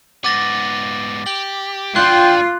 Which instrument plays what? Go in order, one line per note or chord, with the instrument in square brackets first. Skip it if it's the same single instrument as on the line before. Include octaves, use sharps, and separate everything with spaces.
[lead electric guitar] G#2 B3 [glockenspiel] D6 A6 A#6
[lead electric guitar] G4 [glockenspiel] F#7
[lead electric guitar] D3 D4 [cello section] F4 [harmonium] G5 [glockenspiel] C6 F#6